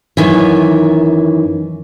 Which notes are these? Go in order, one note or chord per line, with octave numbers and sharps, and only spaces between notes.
F#2 A2 D#3 E3